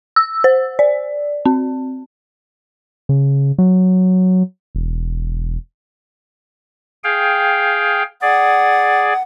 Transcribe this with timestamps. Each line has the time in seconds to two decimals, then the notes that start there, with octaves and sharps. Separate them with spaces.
0.16 E6
0.44 C5
0.79 D5
1.45 C4
3.09 C#3
3.58 F#3
4.75 E1
7.04 G#4 F5 G5
8.22 G#4 D5 F#5